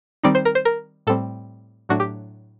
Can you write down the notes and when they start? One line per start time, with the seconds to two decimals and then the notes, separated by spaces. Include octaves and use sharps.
0.23 D#3 G3 C4 D#4 D5
0.35 C5
0.45 A#4
0.55 C5
0.65 A#4
1.07 A2 G3 C4 A4
1.89 A2 F#3 A3 D4 F#4
2.00 G4